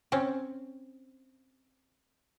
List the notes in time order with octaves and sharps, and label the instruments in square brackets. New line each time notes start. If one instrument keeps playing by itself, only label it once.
[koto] C4 C#4